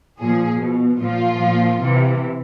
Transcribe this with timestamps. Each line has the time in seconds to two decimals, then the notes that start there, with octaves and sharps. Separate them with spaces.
0.20 A#2 F3 G#4
0.60 B2
1.00 A#2 F3 F4
1.40 A#2 F3
1.81 C3 E3